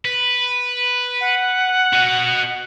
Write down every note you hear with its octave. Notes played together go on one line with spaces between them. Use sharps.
B4
F#5
F#4 D#5